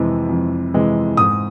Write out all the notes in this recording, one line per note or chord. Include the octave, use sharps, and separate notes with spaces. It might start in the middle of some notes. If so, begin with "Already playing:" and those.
Already playing: F2 C3 E3 G#3
F2
C3 E3 G#3
G#2 D#6